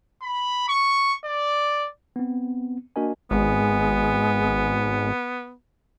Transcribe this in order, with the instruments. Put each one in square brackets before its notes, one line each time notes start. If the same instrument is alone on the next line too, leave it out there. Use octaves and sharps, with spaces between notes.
[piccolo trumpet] B5
C#6
D5
[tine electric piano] B3 C4
A#3 D4 F#4 A#4 D#5 G#5
[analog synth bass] G#1 [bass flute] G#3 [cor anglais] B3